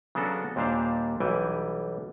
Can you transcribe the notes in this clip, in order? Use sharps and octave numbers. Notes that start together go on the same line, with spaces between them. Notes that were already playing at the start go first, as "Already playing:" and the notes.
C#3 F#3 B3 D4 F#4 A4
D#2 A#2 G3 D4 C5 F5
B1 E3 G3 G5 G#5